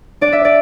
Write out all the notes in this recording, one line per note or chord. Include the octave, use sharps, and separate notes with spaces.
D4 D5
E5
D5